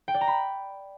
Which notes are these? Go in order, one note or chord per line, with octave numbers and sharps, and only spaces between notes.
G5
D5
A#5
B5